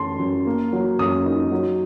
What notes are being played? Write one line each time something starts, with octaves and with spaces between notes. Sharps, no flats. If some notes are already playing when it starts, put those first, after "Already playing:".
Already playing: F#2 F#3 A3 A5 C6
F#2
A#3
F#3
F#2 D#6
D#4
F#3